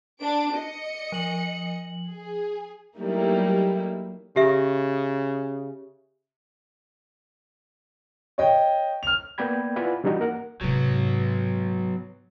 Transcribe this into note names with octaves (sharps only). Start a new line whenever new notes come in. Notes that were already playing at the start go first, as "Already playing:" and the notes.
D4 D7
D#5 C#7
F3 F#7
G#4
F#3 G3 A3 A#3 D#4 E4
C#3 G4 E5
C#5 D#5 G5
F6 F7
A#3 B3 D5 G5 B5 G#6
E4 F4 B4 D5 F#5 G#5
E3 G3 D4 D#4 F#4
A#3 A#4 F#5
G#2 C3 F#3 B3